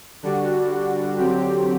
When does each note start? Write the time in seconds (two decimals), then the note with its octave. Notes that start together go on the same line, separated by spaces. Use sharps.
0.23 D3 G3 D4 F#4
1.17 D3 F#3 C4 G4